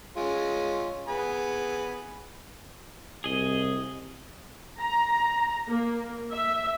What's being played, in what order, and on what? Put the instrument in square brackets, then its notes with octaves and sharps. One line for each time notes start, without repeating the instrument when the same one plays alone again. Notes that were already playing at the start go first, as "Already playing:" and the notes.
[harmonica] G#3 C#4 F4
B3 G#4 B5
[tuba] C2 [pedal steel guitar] G#4 D#5
[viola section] A#5
A#3
E5